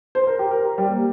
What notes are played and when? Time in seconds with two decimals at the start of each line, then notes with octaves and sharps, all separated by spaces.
0.15 C5
0.27 A#4
0.39 G4
0.51 A#4
0.78 G3
0.86 A#3